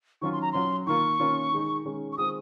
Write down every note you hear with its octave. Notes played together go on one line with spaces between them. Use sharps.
D#3 F#3 C#4 F4 C#6
C6
A#5
F#3 C#4 F4 C6
D#3 A#3 F4 C#6
D#3 A#3 C#4 F4
D#3 G#3 D#4
D#3 G#3 C#4
C#6
D#3 G#3 C4 F4 D#6